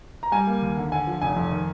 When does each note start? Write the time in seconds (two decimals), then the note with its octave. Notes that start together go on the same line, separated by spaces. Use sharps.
0.23 A#5
0.32 G3 G#5
0.47 A#3
0.62 D#2
0.77 D3
0.92 D3 G#5
1.07 F3
1.21 F1 G#5
1.36 F2
1.51 D#3